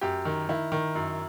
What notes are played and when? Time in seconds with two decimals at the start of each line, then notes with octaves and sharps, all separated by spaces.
0.01 F#2 G4
0.25 D#3
0.49 D#3 E4
0.72 D#3
0.95 F#2